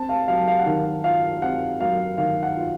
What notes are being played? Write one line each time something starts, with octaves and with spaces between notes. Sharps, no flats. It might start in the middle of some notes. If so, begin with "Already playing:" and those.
Already playing: C4 A5
F5
F#3 F5
F5
F#5
D#3 F5
F4 F5
C4 F#5
F#3 F5
D#3 F5
F#5
F4